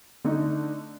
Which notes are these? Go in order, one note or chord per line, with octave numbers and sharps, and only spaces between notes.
D3 A3 D#4